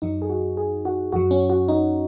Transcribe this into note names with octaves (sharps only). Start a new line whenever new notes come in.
F#2 F#3 D#4
G#4
F#4
G#4
F#4
F#2 F#3 F#4
C#4
F#4
D#4